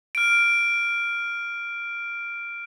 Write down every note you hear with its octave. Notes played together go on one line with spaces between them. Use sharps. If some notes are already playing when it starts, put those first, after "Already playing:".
F6 D7